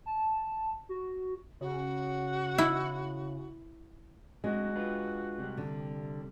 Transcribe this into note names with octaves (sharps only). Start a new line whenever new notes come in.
A5
F#4
C#3 F#4
E4
A2 G#3 C4 D4 F#4
D4 F4 B4
C3 G3
D3